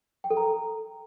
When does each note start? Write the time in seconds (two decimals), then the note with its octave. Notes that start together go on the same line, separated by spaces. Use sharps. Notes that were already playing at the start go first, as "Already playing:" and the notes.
0.24 G5
0.30 A4
0.37 A#5